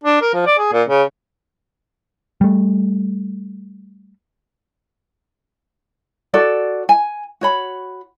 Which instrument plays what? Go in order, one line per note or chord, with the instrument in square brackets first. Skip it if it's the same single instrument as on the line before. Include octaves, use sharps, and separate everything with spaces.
[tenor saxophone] D4
A#4
F3
D5
G#4
A#2
C#3
[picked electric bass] G3 A3
[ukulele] F#4 A4 D5
G#5
F#4 C#5 B5